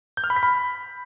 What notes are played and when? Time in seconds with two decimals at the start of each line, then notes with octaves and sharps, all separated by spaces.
0.17 G6
0.24 F6
0.30 B5
0.36 B6
0.43 B5